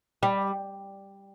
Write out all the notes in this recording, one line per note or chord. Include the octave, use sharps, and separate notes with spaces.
G3